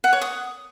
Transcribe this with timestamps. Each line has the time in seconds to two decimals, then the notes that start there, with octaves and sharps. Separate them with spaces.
0.04 F#5
0.13 C#5
0.22 D#6